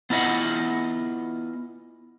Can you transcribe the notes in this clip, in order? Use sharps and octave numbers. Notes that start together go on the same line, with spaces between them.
B3 E4 F4 D#5 F#5 B5